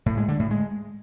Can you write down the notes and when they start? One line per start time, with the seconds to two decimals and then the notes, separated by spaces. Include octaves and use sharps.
0.06 A2
0.17 G#3
0.28 D3
0.40 A2
0.51 G#3